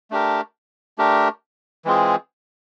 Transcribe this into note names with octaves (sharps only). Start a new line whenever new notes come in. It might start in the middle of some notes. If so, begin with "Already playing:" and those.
A3 D4 G4 A#4
A3 D4 G4 A#4
E3 G#3 C4 F4 G#4